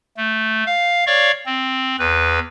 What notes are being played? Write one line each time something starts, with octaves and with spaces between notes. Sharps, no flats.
A3
F5
C#5 D5 F5 C#6
C4
E2 B4